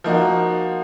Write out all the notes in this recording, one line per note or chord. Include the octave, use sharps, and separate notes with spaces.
F3 A#3 D#4 F#4